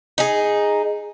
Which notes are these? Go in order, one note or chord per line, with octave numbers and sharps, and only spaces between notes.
D#4 G#4